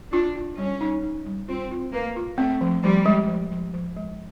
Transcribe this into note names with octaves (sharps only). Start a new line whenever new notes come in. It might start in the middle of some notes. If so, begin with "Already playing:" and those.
D4 F4
F4
G3 C#4
D#4
D#4
G3
C4 F4
F4
A#3 B4
F4
A3 C4
F3
F3 G3
G#3
F3
F3
F3
G#3